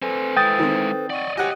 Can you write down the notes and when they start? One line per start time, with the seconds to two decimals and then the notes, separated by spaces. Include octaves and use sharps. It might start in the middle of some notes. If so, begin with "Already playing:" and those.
0.02 C4 A4 B4 C5 G#5
0.37 G#3 E4 G5 D#6 A6
0.59 D#3 C4
1.10 D5 D#5 F#5 C#6
1.37 G4 C#5 D#5 F#5 G#5 A#6